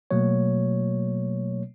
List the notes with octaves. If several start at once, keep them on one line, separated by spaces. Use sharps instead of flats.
B2 F#3 A3 A#3 C#5